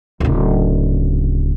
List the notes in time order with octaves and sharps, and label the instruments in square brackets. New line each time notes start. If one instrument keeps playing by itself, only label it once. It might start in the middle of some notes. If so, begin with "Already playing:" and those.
[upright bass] D1 C#3